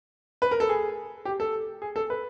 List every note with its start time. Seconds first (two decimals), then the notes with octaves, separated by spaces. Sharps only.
0.42 B4
0.51 A#4
0.60 A4
0.69 G#4
1.25 G4
1.40 A4
1.82 G#4
1.96 A4
2.10 B4